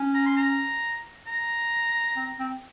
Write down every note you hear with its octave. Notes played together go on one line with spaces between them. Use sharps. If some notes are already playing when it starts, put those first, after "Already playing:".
Already playing: C#4
A#5
C6
A#5
A#5
C4
C4